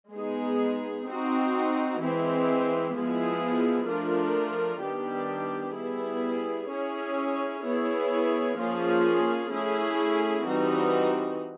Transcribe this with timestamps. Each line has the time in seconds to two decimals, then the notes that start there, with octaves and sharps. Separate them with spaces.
0.11 G#3 B3 D#4 G#4
1.05 C4 D#4 F#4
1.98 E3 G#3 C4 E4
2.93 F3 G#3 B3 E4 G#4
3.86 F3 A3 D4 F4 A#4
4.80 D#3 G3 B3 D4 G4
5.73 G3 B3 E4 G#4
6.68 C#4 E4 G#4 C#5
7.62 B3 E4 G#4 C#5
8.55 F3 A#3 C#4 F4 G#4
9.49 A3 C#4 E4 G#4
10.43 E3 G3 C4 D#4 F#4